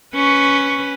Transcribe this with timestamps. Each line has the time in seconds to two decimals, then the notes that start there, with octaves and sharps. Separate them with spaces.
0.15 C#4 B4 C#6